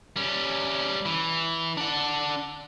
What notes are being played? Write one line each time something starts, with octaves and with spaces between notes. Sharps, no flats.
G3 C#4
E3
D4 F#5